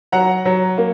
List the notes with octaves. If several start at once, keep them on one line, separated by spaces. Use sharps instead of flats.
F#3 F#5 A#5
F#3
A#3